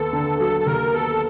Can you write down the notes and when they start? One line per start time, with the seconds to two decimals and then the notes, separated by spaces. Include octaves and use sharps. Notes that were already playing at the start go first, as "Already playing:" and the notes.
Already playing: D#2 B3 A4
0.13 D3
0.39 F#3 A4
0.60 A4
0.66 D#2 A#4
0.93 B3 A4